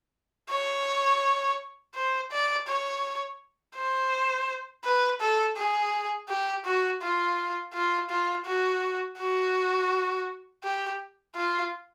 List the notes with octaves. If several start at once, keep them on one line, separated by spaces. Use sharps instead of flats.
C#5
C5
D5
C#5
C5
B4
A4
G#4
G4
F#4
F4
F4
F4
F#4
F#4
G4
F4